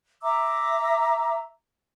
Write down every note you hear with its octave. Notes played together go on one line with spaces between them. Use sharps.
E5 A#5 D6 E6